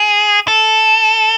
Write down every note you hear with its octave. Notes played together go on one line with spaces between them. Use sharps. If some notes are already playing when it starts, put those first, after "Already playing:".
Already playing: G#4
A4